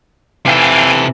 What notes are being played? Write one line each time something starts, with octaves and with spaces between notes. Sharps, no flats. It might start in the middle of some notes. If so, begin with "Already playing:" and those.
C3 E3 A4 F5 G5 G#5